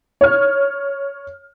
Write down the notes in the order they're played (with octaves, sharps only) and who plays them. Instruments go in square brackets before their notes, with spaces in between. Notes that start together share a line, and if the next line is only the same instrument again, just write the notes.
[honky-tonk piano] C#5 F6